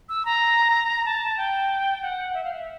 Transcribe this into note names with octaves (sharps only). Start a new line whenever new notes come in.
E6
A#5
A5
G5
F#5
E5
F5
E5